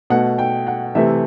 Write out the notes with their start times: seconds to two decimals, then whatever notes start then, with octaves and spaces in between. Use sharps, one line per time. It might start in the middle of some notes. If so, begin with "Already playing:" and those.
0.10 B2 A3 F#5
0.39 G5
0.67 F#5
0.95 C3 E3 A3 E5